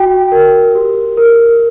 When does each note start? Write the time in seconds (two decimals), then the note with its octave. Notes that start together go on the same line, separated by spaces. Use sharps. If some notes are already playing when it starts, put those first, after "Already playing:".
Already playing: F#4 G5
0.32 A#4
0.75 G4
1.17 A#4